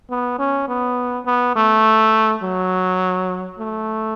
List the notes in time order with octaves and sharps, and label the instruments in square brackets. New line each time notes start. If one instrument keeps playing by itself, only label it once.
[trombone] B3
C#4
B3
B3
A3
F#3
A3